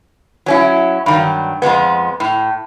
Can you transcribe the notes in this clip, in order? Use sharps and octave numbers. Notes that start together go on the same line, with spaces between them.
F#3 C#4 E4
G2 D#3 F#3
F2 F3 G#3 B3
A2